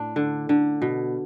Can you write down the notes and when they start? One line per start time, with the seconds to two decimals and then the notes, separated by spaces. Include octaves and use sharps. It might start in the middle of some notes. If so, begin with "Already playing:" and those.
Already playing: A2 D4
0.16 D3
0.49 D3
0.82 B2